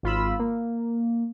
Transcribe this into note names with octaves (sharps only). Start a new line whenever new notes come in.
G#1 F4 B5 E6
A#3